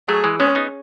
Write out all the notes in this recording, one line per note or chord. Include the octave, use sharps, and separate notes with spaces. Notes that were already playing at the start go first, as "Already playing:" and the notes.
F#3 A3 G#4
E3 G#3
G#3 B3 C#4
B3 D#4